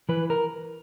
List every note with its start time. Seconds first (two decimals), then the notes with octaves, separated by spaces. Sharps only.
0.09 E3 B4
0.30 A#4